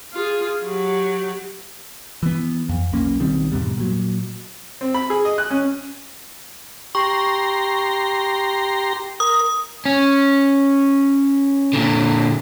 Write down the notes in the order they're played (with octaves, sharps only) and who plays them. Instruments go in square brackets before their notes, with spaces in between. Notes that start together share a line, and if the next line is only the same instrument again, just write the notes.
[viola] F4 G#4
F#3 G4
[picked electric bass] E3 B3
F2
E1 B1 A#3 C#4
B1 D#3 G3 C4
E2 G#2 B2 G3
A#2 F#3
[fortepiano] C4
B5
G#4
D#5
F#6
C#4
[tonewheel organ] G4 A#5 C6 [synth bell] C#6
[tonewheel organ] A#4 [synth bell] D#6
[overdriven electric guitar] C#4
A#2 D3